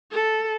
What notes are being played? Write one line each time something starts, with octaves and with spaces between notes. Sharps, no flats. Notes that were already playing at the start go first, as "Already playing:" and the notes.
A4